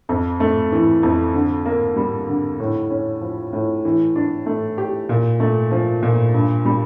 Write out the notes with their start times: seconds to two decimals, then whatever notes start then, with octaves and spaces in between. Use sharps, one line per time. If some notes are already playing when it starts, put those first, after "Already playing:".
0.09 F2
0.40 A3
0.72 E3
1.03 F2
1.34 D3
1.65 A#3
1.96 G3
2.28 D3
2.60 A2
2.90 C#4
3.21 F3
3.53 A2
3.85 E3
4.16 D4
4.46 A3
4.78 G4
5.09 A#2
5.40 A3
5.71 F3
6.03 A#2
6.34 G2
6.65 G3